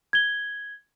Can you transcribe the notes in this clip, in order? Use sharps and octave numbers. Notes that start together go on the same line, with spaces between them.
G#6 G7